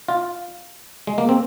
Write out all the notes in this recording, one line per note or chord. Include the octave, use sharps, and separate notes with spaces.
F4
G#3
A#3
C4